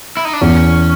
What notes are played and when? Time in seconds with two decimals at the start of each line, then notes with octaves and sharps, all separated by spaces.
0.17 E4
0.25 D#4
0.33 D4
0.41 E2 C#4